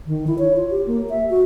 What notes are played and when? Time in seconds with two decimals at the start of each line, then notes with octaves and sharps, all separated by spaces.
0.07 D#3
0.27 E4
0.39 C#5
0.56 F4
0.70 G4
0.87 A#3
1.10 E5
1.30 F#4